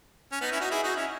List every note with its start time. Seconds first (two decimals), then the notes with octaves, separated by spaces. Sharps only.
0.32 C#4
0.41 B3 D#4
0.51 C#4 E4
0.61 D#4 F#4
0.71 E4 G#4
0.83 D#4 F#4
0.97 C#4 E4